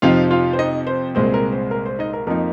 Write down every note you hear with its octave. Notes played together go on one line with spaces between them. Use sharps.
F2 C3 F3 C4 D#4 F4 F5
F4 F5
C5
D#4 D#5
C5
C2 A#2 G#3 C4 C5
A#4
C5
A#4
C5
D#4 D#5
A#4
F2 F3 A#3 D#4 A#4